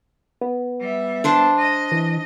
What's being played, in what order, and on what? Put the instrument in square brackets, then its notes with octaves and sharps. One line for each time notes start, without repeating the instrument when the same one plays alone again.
[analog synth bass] B3
[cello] G3 E5
[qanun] D4 C5 A5
[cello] D#5
[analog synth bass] E3